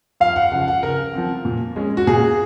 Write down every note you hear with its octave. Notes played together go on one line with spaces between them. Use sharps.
F2 F5
F#5
C#3 F3 F#5
F#5
C#3 A#4
F3 C4
A#2
G#3 C#4
F#4
A#2 G#4